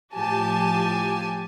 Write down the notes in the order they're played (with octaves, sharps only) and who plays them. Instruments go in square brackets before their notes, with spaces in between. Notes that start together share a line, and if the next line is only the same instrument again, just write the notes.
[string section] A2 F3 G4 G#5 A5